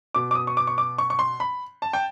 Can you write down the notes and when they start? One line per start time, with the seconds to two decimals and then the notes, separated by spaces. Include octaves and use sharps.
0.15 B2 D6
0.31 D6
0.35 D#6
0.47 C#6
0.57 D6
0.67 C#6
0.78 D6
0.98 C#6
1.10 C#6
1.19 C6
1.40 B5
1.82 A5
1.93 G5